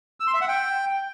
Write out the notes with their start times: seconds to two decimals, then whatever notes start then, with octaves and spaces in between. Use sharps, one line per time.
0.20 E6
0.27 C6
0.34 E5
0.41 F#5
0.48 G5